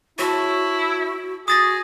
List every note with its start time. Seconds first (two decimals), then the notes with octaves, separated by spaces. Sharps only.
0.19 E4 F#4 C#5 A5
1.48 F#4 G#4 D#6 A6 A#6